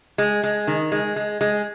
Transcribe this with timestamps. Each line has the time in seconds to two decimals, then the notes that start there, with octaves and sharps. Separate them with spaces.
0.18 G#3
0.44 G#3
0.67 D#3
0.92 G#3
1.16 G#3
1.41 G#3